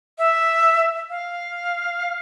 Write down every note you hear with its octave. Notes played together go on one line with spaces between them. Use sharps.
E5
F5